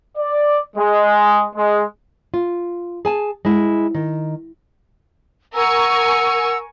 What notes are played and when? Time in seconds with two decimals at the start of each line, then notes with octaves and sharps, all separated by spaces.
0.18 D5
0.76 G#3
1.56 G#3
2.34 F4
3.05 G#4 G#5 A5
3.45 G#3 E4
3.94 D#3
5.54 A#4 F#5 G#5 A#5 C#6 E6